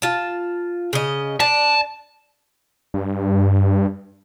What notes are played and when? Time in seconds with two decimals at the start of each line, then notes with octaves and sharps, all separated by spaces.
0.02 F4 A5
0.93 C#3 D#5
1.40 D4 A5
2.94 G2